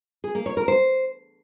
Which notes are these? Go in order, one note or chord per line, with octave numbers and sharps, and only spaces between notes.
G#4
A#3
C#5
A#4
C5